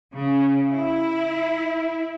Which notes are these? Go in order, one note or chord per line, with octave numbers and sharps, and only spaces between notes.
C#3
E4